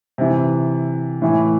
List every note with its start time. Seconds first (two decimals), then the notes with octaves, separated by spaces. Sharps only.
0.18 C3 E3
1.22 A2 E3